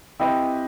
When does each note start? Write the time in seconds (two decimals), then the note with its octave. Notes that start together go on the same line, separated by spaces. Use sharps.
0.20 C4 E4 G4 B4 D#5